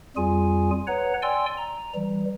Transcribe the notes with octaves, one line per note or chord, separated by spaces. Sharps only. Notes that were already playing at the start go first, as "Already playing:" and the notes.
F2 G3 F4 G#4 G#5
B4 C#5 F#5 A#5
D5 G5 G#5 C6 E6
A#5
E3 G3